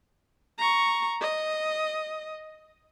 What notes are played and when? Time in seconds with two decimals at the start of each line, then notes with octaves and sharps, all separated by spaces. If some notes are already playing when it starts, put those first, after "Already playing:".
0.58 A#5 C#6
1.21 D#5